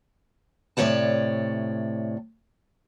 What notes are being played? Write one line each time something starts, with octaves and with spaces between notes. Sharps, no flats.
A2 C3 A#3 C#5 D5 A5